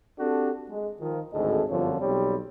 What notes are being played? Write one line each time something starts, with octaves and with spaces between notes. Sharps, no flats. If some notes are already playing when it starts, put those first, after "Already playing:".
C4 D4 F#4 G4 A4
G#3
D#3 F3
G#1 D2 A2 G#4 A4 D#5
G1 F#2 D3 F3 C4 C#5
B1 G3 C4 G4 C#5